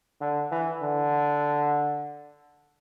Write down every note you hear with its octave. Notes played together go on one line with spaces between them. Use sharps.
D3
E3
D3